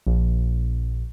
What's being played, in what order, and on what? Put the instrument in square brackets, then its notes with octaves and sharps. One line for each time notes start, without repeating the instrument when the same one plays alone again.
[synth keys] A#1